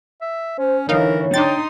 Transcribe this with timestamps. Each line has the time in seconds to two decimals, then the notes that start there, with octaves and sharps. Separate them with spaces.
0.21 E5
0.59 C#4 C5
0.89 D3 E3 D#4 A#4 C#5 F5
1.34 D4 D#4 G5 C6 D#6 A6